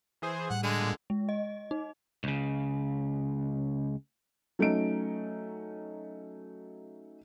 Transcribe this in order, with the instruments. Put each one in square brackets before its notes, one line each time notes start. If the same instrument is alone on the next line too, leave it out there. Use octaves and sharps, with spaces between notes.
[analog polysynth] E3 G#4 C5
[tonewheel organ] A2 G3 [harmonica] F#5
[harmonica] D3 G#3 [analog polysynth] D#7
[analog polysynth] A#2
[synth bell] G#3
D#5
D#4
[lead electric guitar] C#2 C#3
[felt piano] F#3 A3 C#4 D#4 D7